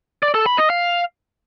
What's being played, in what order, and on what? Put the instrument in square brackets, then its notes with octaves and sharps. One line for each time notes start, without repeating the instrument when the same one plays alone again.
[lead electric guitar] D5
A4
B5
D#5
F5